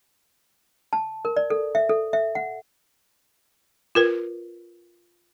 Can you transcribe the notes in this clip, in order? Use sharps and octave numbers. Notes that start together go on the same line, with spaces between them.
A5
A#4
D5
A4
E5
A4
E5
F#5
F4 A#4 B4